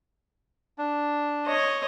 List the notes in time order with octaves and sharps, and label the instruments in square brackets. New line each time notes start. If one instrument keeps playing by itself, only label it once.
[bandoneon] D4
[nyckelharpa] C#5 D#5